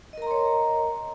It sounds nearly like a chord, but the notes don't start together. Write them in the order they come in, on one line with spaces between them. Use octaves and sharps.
D#5 A#4 A#5 C6 C#5